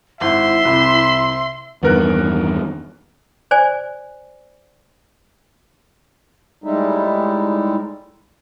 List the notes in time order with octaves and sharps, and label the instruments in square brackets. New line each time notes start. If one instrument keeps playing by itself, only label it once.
[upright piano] G#1 [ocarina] E4 [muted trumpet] E5 [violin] C6
[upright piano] C2 C3 B5
[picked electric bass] E2 G2 D#3 [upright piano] B3 A#4 F#6
[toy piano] C5 D5 G#5
[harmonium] A2 G3 G#3 D#4 E4